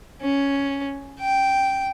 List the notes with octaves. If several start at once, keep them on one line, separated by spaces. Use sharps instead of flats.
C#4
G5